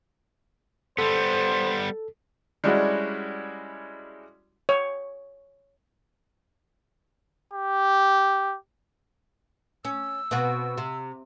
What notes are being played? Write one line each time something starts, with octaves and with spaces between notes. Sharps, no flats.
G3 B3 A4 C5
G3 G#3 C#4 D4 E4 F#4
C#5
G4
C#4 E6
B2 C4 F#4
C3